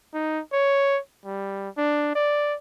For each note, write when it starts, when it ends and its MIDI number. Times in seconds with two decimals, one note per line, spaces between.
0.14 0.40 63
0.53 0.99 73
1.25 1.69 55
1.77 2.13 62
2.15 2.55 74